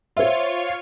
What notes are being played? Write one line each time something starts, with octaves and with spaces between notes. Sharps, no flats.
F4 C5 C#5 E5